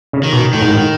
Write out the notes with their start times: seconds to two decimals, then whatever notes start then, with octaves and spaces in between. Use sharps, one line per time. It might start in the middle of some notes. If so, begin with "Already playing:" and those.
0.13 C#3
0.23 D#3
0.33 B2
0.53 A2 D#3
0.62 G#2
0.70 A2